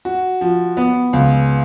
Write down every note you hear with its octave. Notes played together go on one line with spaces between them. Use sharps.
F#4
F3
B3
C#2